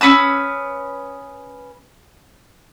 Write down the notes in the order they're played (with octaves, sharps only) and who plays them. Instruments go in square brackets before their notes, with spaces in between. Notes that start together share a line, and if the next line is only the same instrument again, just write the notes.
[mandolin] C#4 B4 D#6 E6